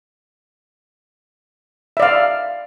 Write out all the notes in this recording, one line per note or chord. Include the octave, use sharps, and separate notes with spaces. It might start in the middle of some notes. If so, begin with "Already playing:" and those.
D5 E5 F5